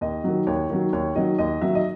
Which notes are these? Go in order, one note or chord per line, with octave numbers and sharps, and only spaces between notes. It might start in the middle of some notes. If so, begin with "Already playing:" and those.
D#2 D#5
D#3 F#3
D#2 C#5
D#3 F#3
D#2 C#5
D#3 F#3 D#5
D#2 D#5
D#3 F#3 E5
D#5